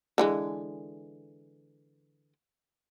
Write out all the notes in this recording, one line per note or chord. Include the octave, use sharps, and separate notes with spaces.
D3 E3 G#3